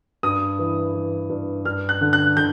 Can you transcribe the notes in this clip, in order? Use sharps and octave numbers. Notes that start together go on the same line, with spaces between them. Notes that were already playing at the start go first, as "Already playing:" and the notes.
G2 D#6
E3
E3
G2
G2 F6
F#6
D3
F#6
D3 G6